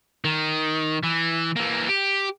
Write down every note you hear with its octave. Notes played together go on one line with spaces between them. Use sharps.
D#3
E3
E3 A#3
G4